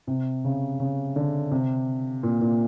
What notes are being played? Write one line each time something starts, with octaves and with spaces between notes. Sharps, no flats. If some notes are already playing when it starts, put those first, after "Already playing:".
C3
C#3
C#3
D3
C3
A#2
A#2